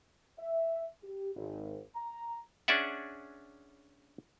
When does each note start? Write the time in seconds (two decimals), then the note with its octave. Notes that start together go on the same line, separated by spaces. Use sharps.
0.39 E5
1.03 G4
1.36 G#1
1.95 A#5
2.68 C#4 D4 G#4 D5 E5 F#5